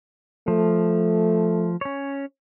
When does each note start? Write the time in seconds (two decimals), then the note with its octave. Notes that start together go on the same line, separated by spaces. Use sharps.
0.48 F3 A3
1.81 C#4 C#5